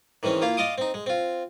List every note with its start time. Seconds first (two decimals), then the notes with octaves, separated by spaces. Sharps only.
0.23 D#3 E3 G#3 C4 C#4
0.42 A#3 E4 F4 F5
0.57 D5 D#5 F5 C6 D6 D#6
0.78 C4 D#4
0.94 G#3
1.06 C4 F4